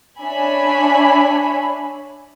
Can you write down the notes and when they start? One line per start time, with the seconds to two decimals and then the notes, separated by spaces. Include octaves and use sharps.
0.21 D4 C#5 E5 G#5 B5